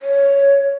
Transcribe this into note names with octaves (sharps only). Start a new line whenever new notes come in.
C#5